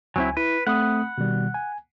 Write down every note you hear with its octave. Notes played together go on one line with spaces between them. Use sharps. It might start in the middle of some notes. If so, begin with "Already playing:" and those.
C#2 F#3 C4 E4 G#5
E4 B4
A3 C4 F#5 B5 D#6
B2 D#3 G3
G#5